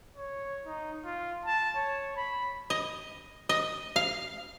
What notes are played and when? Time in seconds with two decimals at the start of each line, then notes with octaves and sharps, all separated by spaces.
0.16 C#5
0.66 D#4
1.05 F4
1.45 A5
1.76 C#5
2.17 B5
2.70 D#5
3.49 D#5
3.96 F5